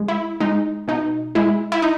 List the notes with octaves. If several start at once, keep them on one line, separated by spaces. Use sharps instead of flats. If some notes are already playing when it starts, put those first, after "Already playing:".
Already playing: G#3
E4
G#3 D#4
B2 D#4
G#3 E4
E4
D#4